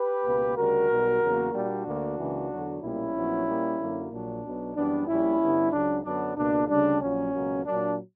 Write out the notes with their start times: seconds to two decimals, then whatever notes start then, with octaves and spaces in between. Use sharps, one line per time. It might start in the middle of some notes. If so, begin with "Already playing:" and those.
Already playing: G4 B4
0.24 C#2 B2 A#3
0.56 D2 C#3 G3 F#4 A#4
0.89 B1 B2 G3
1.22 E2 C#3 F#3 A#3
1.53 A#2 G3 A#3 D4 F#4
1.86 D2 D3 A#3
2.18 C#2 C#3 E3 A#3
2.50 E2 D3 F#3
2.82 B1 A#2 G3 A#3 C#4 E4
3.15 A#1 A#2 F#3 B3
3.47 A#2 G3 A#3
3.79 F#2 D3 F#3 A#3
4.11 A#1 A#2 F#3 D4
4.43 B1 B2 F#3 B3
4.76 F#2 E3 G3 B3 D4
5.08 A#1 A#2 G3 C#4 E4
5.41 G2 D3 G3 B3
5.72 C#2 C#3 F#3 D4
6.04 F#2 D3 F#3 B3 D4
6.37 C#2 B2 A#3 D4
6.68 D2 C#3 G3 D4
7.01 A#1 A#2 F#3 C#4
7.33 C#2 B2 F#3 A#3
7.65 A#2 F#3 A#3 D4